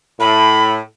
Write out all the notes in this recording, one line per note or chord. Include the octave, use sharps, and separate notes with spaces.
A2 B5